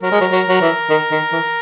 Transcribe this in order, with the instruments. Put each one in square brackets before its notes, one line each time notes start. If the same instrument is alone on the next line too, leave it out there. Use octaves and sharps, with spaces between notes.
[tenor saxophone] F#3 [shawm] A#4
[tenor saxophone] G#3
F#3
F#3
F#3
E3
D#3
D#3
E3